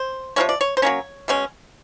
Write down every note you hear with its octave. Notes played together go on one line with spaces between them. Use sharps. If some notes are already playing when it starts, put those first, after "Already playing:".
Already playing: C5
C3 F3 A#3 C#4 C#5
D5
C#5
C5
F#3 A#3 C#4 C#5
B2 G#3 C#4